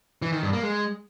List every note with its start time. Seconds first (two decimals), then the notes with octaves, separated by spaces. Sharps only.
0.22 E3
0.32 D#3
0.43 G2
0.53 A#3
0.63 G#3